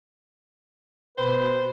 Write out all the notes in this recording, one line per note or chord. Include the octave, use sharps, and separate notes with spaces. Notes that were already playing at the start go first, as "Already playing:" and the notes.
B2 B4 C5